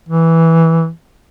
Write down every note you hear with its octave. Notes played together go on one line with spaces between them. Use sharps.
E3